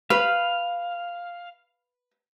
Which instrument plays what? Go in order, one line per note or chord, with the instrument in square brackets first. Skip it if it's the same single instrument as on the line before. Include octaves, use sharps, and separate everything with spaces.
[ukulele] B4 [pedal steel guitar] F5